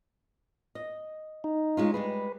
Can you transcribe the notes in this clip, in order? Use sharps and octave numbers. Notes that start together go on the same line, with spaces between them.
D#5
D#4
G#3 C#4 F4
G3 G#3 G#4 B4